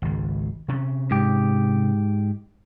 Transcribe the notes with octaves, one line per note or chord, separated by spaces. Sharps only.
G#1 C#2
C3 C#4
G#2 G4